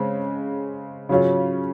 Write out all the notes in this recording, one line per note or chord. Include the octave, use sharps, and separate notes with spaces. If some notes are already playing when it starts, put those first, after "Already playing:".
Already playing: C#3 G#3 C4
C#3 F#3 C#4 F4